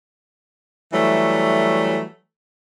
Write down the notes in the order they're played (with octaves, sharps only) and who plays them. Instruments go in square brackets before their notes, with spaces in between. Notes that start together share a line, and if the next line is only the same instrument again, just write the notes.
[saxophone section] E3 F#3 G3 A3